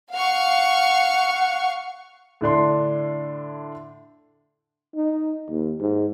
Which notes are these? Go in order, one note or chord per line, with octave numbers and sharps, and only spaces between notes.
F5 F#5 C#6
A2 D3 D4 C6
D#4
D#2
G#2